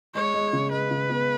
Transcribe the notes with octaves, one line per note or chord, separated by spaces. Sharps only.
G#3 C#5
G#3
C#3
G#3 B4
C#3
B3